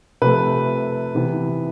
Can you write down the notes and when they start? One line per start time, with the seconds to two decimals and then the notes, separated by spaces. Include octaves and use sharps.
0.22 C3 F3 A3 B4
1.15 C3 E3 B3